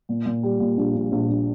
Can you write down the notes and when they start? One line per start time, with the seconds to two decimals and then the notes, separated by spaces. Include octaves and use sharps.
0.09 A#2
0.26 A#2
0.43 G3
0.60 A#2
0.77 A#1
0.95 A#1
1.12 A#1
1.29 A#1